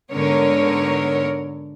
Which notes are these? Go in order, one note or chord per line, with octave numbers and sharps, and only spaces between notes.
G#2 D3 B3 A#4 C#5